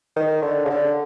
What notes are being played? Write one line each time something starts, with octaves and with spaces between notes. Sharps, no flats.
D#3
D3
C#3
D3